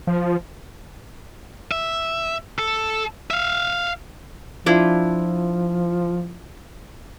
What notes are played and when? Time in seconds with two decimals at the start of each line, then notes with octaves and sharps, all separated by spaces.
0.07 F3
1.71 E5
2.59 A4
3.31 E5 F5
4.66 F3 D4 E4 F4